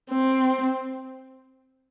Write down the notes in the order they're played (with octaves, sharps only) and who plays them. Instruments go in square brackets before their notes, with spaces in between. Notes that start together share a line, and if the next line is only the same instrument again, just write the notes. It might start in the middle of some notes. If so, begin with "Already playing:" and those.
[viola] C4